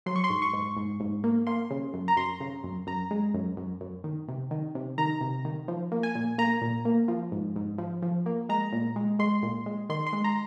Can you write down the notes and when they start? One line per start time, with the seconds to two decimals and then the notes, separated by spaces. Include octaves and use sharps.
0.06 F#3 C6
0.16 C#6
0.24 C6
0.30 G#2
0.42 C#6
0.53 G#2
0.77 G#2
1.00 G#2
1.24 A#3
1.47 A#3 C6
1.71 C#3
1.94 F#2
2.08 A#5
2.17 F#2 C6
2.40 C#3
2.64 F#2
2.87 F#2 A#5
3.11 G#3
3.34 F#2
3.57 F#2
3.81 F#2
4.04 D#3
4.28 C3
4.51 D#3
4.75 C3
4.98 D#3 A#5
5.21 C3
5.45 D#3
5.68 F3
5.92 A#3
6.03 G#5
6.15 A#2
6.38 A#3 A#5
6.62 A#2
6.85 A#3
7.08 F3
7.32 G#2
7.56 G#2
7.78 F3
8.02 F3
8.26 A#3
8.49 G#3 A#5
8.73 A#2
8.96 G#3
9.19 G#3 C6
9.43 A#2
9.66 G#3
9.90 D#3 C6
10.07 C6
10.13 G#3
10.24 A#5